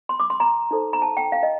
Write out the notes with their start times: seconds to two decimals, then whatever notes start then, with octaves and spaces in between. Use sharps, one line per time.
0.09 C6
0.20 D6
0.30 C6
0.40 A#5
0.71 D#4 A4 C5
0.93 A#5
1.02 A5
1.17 G5
1.32 F5
1.43 D#5